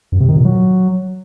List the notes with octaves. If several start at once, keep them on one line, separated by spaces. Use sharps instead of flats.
F#2
C3
D#3
A#2
F#3